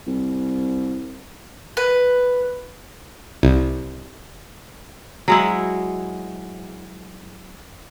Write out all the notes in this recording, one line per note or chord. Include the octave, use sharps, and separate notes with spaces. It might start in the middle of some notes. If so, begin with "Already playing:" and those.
C2
B4
C2
F#3 G#3 E4